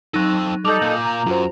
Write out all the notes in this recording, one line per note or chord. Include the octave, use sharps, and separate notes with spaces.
F#3 C4 D#4 A4
G3 D#4 A4 D6 G6 F7 F#7
A#2 A#3
A#5
F#2 F4 F#4 C5